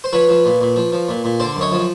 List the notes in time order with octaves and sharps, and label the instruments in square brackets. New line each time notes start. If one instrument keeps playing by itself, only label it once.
[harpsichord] C5
F3 B4 C#5
F3
A#2
A#2
F3
F3
A#2
A#2
D3 C5 D5
F#2
C#5 D#5
F3